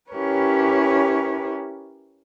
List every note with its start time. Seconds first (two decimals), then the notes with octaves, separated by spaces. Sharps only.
0.12 C#4 E4 G4 A#4 B4 C#5